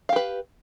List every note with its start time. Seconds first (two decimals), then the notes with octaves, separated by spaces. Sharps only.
0.09 F5
0.13 G4
0.16 B4